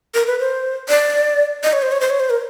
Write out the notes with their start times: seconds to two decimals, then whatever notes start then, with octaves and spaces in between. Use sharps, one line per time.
0.14 A#4
0.27 B4
0.40 C5
0.89 D5
1.64 D#5
1.73 C#5
1.82 C5
1.92 C#5
2.01 C5
2.10 C#5
2.20 C5
2.30 A#4